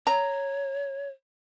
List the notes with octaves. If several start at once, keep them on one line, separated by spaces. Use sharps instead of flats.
C#5 A#5